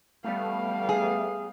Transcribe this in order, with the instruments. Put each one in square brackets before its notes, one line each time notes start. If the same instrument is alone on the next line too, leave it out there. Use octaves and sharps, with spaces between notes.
[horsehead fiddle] G3 F5 [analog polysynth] A3 B3
[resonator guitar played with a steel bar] G#4